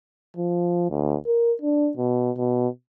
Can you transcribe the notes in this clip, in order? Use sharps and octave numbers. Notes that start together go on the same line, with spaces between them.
F3
D2
A#4
D4
B2
B2